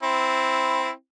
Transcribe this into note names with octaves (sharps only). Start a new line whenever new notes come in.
C4 E4